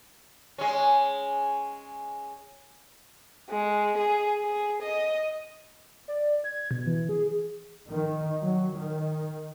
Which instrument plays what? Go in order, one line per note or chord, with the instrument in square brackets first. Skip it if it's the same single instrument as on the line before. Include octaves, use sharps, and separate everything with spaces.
[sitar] G#3 C#4
[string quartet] G#3
G#4
G#4
D#5
[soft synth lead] D5
G#6
B2
E3
G#4
[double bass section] D#3
F#3
D#3